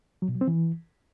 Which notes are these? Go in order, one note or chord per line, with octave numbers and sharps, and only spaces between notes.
F#3
B2
F#3
C4
E3